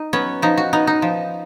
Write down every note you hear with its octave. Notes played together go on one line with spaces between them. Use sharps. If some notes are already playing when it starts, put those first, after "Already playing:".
Already playing: D#4
F#3 B3 C#4
F3 D#4
F#4
B3 D#4
D#4
F3